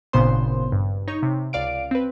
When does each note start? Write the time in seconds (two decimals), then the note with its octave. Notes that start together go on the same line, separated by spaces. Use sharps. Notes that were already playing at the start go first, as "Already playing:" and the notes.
0.13 G#1 A#2 C#3 B3 C5 C6
0.72 G2
1.07 D#4 C#5 C#6
1.23 C3
1.53 C#2 D5 F5 D7
1.91 C4 B4